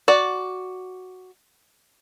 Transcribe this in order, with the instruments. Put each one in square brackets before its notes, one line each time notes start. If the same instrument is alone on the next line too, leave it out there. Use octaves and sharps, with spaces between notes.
[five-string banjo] F#4 D5